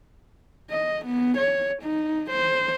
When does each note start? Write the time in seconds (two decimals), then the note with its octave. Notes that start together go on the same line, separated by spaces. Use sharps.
0.70 D#5
1.06 B3
1.38 C#5
1.83 D#4
2.31 C5